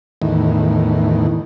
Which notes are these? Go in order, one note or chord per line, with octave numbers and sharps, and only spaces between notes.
E2 A2 D#3